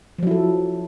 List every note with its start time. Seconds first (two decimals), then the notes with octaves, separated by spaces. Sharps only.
0.18 F3
0.23 F#3
0.27 E4
0.31 A4